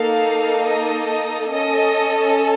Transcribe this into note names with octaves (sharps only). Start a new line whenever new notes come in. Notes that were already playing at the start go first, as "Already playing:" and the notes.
Already playing: A#3 D#4 A4 F5
D#5
C#4 A4 D#5